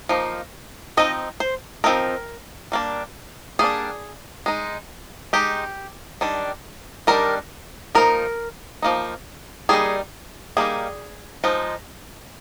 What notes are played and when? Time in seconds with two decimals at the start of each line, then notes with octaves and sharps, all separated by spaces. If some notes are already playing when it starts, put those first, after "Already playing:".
0.09 F3 A#3 D#4
0.97 F3 C4 D#4 D#5
1.40 C5
1.84 F3 C4 D#4 A#4
2.72 G3 A#3 D4
3.59 G3 A#3 D4 G#4
4.46 G#3 D#4
5.33 G#3 D#4 G4
6.21 D#3 G3 D4
7.07 D#3 G3 D4 A#4
7.95 F3 A#3 D#4 A#4
8.82 F3 A#3 D#4
9.69 G3 A#3 D#4 G#4
10.57 G3 A#3 D#4 G#4
11.44 F3 G#3 D#4